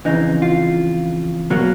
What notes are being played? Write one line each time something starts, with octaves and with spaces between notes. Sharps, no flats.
F2 C#3 E3 D#4
F4
B2 F#3 A#3